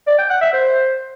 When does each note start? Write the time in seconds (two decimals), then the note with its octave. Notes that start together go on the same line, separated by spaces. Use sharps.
0.07 D5
0.18 G5
0.30 F#5
0.41 E5
0.52 C5